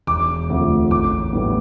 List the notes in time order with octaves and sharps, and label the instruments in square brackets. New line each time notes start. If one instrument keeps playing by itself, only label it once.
[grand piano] E1 D6
D2 C3 F3 A3
A1 D6
A2 G3 B3